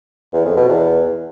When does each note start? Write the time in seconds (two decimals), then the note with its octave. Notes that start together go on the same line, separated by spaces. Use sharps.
0.34 E2
0.45 F2
0.57 B2
0.68 E2